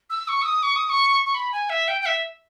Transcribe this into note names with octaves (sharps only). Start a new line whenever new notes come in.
E6
C#6
E6
D#6
C#6
D#6
C#6
C#6
B5
G#5
E5
G5
G5
E5